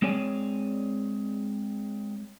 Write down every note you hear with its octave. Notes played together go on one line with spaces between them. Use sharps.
G#3 C4 G#4 C#5 D5 G#5